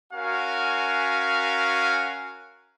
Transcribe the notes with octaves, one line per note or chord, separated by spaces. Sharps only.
C#4 F#4 A#4 F5 G#5